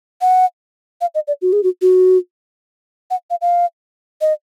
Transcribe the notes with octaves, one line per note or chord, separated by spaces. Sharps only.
F#5
F5
D#5
D5
F#4
G#4
F#4
F#4
F#5
F5
F5
D#5